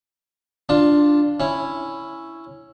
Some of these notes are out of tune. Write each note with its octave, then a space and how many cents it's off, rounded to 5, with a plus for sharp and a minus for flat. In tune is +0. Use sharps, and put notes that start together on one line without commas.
D4 +0 F4 +0 A5 +20
C#4 -5 E4 +0